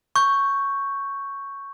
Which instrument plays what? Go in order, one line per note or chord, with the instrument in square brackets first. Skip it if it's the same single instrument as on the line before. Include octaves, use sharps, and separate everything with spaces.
[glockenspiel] C#6 G6